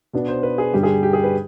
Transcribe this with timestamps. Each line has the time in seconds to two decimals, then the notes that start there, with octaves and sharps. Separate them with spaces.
0.13 B2 B3 D4
0.28 C5
0.43 B4
0.58 G#4
0.73 G2 D3 G3 G4
0.83 G#4
1.03 G4
1.13 G#4
1.23 B4